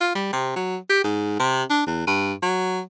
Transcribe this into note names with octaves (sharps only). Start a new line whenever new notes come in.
F4
G3
C3
F#3
G4
G#2
C3
D4
E2
G2
F#3